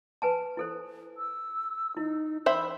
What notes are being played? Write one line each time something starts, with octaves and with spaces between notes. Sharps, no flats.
B4 G#5 A5
E4 A4 C5
E6
D#4 E4
C5 E5 B5 C6 E6